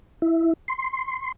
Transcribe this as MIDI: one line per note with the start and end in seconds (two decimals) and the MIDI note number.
0.22 0.53 64
0.68 1.32 84